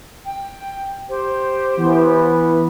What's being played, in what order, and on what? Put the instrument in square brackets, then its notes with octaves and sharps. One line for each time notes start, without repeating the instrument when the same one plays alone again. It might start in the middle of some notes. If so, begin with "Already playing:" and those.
[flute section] G5
G4 C5
[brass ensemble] E3 B3